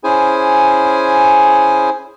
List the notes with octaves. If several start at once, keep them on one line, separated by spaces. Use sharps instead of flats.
C#4 E4 G#4 C5 G#5